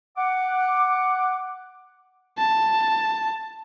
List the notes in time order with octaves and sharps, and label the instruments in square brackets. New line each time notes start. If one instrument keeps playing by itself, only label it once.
[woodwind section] F#5 D6
[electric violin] A5